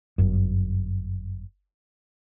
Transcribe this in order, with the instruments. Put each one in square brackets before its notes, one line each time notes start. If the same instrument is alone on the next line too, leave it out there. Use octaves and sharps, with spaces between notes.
[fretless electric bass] G1 F#2